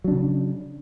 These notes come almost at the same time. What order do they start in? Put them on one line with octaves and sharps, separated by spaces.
F#3 D4 C#3